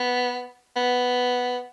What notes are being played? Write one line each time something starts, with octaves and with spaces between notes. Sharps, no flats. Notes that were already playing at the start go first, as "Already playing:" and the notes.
Already playing: B3
B3